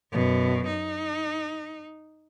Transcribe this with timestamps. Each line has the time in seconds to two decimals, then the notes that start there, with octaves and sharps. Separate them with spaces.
0.12 F#2 B2
0.67 D#4